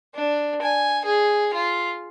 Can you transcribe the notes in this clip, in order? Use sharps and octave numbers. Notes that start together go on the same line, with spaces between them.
D4
G#5
G#4
F4